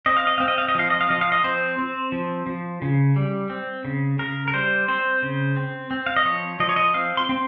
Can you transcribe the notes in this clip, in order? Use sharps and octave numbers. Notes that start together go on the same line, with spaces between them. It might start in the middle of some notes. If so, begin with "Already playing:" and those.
C4 D#5
F5
D#5
C4 F5
D#5
F5
D#5
F3 F5
D#5
F5
F3 D#5
F5
D#5
C4 C5
C4
F3
F3
C#3
G3
C4
C#3
C#3 A#4
A#4
G3 C5
C4 C5
C#3
C4
C4
F5
D#5
F3 C#5
F3 D#5
C#5
D#5
C4 F5
C6
C4